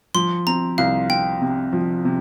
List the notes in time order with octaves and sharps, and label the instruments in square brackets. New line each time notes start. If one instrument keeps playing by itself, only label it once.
[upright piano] F3 [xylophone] C6
[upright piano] C4 [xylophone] A#5
[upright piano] C2 [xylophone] F5
[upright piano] C4 [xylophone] G5
[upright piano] C3
F3
C3